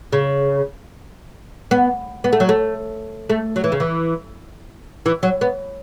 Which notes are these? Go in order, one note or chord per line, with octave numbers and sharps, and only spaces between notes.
C#3
B3
B3
A3
F#3
A3
A3
F#3
E3
C#3
E3
E3
F#3
B3